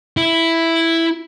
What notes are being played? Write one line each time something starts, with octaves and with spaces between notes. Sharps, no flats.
E4